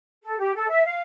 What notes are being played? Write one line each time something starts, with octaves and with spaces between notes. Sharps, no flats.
A4
G4
A4
E5
F5